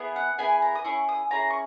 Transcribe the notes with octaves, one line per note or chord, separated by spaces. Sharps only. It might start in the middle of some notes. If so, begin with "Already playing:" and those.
Already playing: B3 E4 G#4
F#5
B3 E4 G#4 G#5
A#5
D#6
C#4 E4 G#4 C#6
D#6
C#4 E4 G#4 A#5
C#6